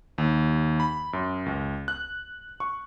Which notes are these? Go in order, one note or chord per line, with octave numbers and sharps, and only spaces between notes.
D#2
B5
F#2
C#2
F#6
C#6